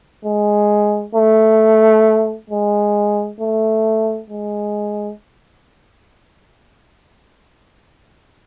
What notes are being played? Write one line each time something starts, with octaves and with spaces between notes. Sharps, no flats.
G#3
A3
G#3
A3
G#3